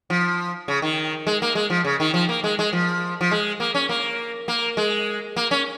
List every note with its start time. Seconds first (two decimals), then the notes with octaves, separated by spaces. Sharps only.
0.10 F3
0.68 C#3
0.82 D#3
1.27 G#3
1.42 A#3
1.55 G#3
1.70 F3
1.85 C#3
2.00 D#3
2.14 F3
2.29 A#3
2.44 G#3
2.59 G#3
2.73 F3
3.21 F3
3.31 G#3
3.60 A#3
3.75 C#4
3.89 A#3
4.48 A#3
4.77 G#3
5.36 A#3
5.51 C#4